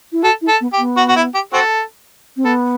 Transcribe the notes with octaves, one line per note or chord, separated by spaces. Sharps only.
E4
F#4 A4
E4
A4
B3
G4
B3
F#4
F#4
E4
G4
C4 F#4 A4
C4
B3 A4